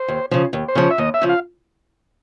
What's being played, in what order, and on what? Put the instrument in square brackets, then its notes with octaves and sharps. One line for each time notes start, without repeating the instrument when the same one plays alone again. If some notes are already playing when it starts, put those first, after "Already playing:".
Already playing: [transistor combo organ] C5
[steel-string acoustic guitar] D#2
C#3 F3
D#2
[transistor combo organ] C5
[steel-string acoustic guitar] C#3 F3 [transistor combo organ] C#5
[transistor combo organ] E5
[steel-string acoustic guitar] D#2 [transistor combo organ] D#5
[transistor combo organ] E5
[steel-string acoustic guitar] C#3 F3
[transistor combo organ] F5